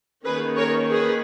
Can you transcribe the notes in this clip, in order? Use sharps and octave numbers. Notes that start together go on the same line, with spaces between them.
D#3 A#3 C#4 G#4 B4
A#4 C#5
G#4 B4